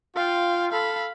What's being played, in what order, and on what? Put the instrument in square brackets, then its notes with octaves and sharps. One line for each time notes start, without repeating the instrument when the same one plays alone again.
[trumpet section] F4 [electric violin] F5 G5
[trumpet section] A4 [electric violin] F5 B5